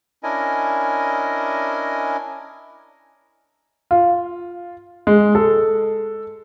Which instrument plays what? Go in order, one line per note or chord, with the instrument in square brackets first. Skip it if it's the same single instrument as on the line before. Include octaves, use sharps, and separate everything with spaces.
[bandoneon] C#4 D4 E4 A#4 D#5 G#5
[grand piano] F4
G#3
A4